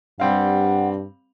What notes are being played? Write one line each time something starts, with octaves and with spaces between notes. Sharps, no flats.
G2 G3 C4 F5 F#5